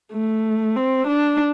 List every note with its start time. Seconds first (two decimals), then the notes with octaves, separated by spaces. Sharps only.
0.13 A3
0.76 C4
1.08 D4